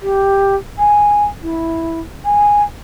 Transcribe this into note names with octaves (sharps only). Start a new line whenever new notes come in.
G4
G#5
E4
G#5